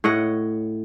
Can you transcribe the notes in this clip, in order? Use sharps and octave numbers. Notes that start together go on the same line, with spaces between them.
A2 C#5 D#5 F#5